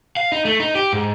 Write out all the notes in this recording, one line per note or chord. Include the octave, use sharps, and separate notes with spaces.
F5
D#4
A3
D#4
G4
G#2